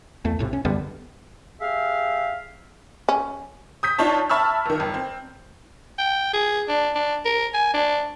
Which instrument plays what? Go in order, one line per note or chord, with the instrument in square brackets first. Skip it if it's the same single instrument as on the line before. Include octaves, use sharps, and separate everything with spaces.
[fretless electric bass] E2 A3
B1 A2 C3
C#4
F#2 D3 G3 B3
[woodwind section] G4 G#4 E5 F5
[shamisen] C#4
[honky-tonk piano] D#6 G6 B6
D4 D#4 F4 C#5 A5
E5 A5 B5 C#6 E6 F6
F#1 D#3
G1
C4
[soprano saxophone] G5
G#4
D4
D4
A#4
G#5
D4